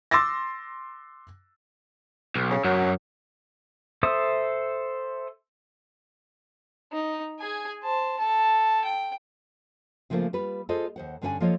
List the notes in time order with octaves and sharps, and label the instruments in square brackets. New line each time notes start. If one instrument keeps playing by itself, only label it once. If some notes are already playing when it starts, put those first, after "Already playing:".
[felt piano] C6 D6 E6 A6 A#6
[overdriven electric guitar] B1
[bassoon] C#3
[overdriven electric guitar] F#2 [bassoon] F#3
[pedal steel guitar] A4 C5 E5 D#6
[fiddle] D#4
G#4 G#5
C5 A5
A4 A5
G5
[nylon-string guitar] C#3 F3 A3 A#3 F4 C5
G3 F4 B4
F4 G#4 A4 C5 D#5
D#2 C5 F#5
G2 D3 C#4 B4 D5 G#5
F3 A#3 F4 A4 C#5 D#5